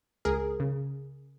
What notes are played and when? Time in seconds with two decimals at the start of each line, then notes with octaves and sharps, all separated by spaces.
0.25 C#2 G#4 A#4
0.60 C#3